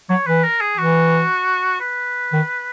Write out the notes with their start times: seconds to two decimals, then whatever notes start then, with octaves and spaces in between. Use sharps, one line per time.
0.09 F#3 C#5
0.26 E3 B4
0.43 A#4
0.61 G#4
0.77 E3 F#4
1.80 B4
2.33 D#3